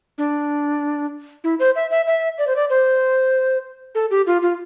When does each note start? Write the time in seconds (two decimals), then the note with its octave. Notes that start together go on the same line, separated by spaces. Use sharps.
0.18 D4
1.44 E4
1.60 C5
1.76 E5
1.91 E5
2.07 E5
2.38 D5
2.47 C5
2.56 D5
2.70 C5
3.95 A4
4.11 G4
4.27 F4
4.42 F4